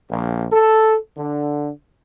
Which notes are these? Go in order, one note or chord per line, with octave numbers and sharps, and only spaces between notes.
A#1
A4
D3